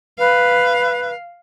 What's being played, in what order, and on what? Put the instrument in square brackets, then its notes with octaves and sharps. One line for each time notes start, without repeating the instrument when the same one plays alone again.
[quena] B4 [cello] F5